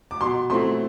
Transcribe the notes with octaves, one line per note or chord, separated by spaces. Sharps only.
D6
B2 C6
A3 C4 E4 C6